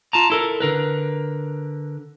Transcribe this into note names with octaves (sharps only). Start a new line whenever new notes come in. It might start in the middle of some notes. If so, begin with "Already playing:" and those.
F4 A5 A#5
E4 A4 A#4
D3 A#4 B4